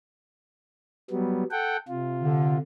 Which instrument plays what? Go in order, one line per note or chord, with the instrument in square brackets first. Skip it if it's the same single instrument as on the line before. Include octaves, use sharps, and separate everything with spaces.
[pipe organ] F#3 G3 B3
A4 F#5 G5
C3 F4
[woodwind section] D3